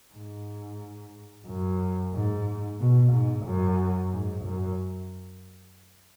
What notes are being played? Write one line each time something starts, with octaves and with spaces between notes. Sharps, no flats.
G#2
F#2
G#2
B2
G#2
F#2
G#2
F#2